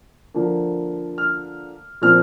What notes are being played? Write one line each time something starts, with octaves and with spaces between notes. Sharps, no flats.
D3 F3 A#3
F6
A#2 F3 C4 F6